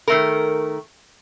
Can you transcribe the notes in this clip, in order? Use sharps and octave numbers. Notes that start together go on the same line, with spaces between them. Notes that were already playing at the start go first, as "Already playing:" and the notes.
D#3 A3 A#4